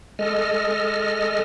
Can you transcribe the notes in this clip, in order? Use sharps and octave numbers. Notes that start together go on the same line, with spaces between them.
G#3 A4 D#5 F6